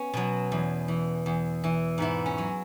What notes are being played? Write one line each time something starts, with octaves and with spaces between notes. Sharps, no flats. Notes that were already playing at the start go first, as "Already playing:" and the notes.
Already playing: B3 C#4
B2 F#3
E2
E3
E2
E3
G#2 B3 E4
C#4
F#3